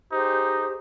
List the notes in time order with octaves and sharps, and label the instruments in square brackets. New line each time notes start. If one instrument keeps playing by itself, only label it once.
[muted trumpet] D#4 [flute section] G4 G#4 C5